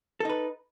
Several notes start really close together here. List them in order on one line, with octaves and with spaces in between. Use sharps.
A4 D#4 B4